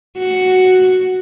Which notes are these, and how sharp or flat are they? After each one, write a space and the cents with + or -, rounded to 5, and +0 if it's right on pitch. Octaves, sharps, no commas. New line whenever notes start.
F#4 +0